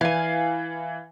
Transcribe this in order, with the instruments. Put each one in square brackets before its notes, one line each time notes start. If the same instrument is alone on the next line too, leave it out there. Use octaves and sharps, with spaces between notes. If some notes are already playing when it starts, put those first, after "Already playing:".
[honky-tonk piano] E3 [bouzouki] F5 G#5